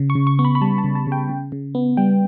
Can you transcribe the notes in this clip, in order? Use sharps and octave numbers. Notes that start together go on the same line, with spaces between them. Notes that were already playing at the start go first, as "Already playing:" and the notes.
Already playing: C#3
C#6
C#3
C#6
B3 C#6
B5
B5
G3 A5
A5
C#3
A5
C#3
G5
C#3
C#3
B3
G3 G5